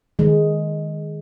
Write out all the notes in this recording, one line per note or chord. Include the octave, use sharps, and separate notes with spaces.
D#3 G#3